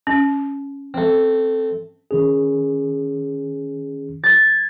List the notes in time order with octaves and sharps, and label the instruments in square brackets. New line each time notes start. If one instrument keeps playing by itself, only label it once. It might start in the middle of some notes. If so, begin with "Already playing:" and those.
[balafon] C#4
[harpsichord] A3 C4
[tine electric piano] D#3 C#4 G#4
[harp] G#6 A6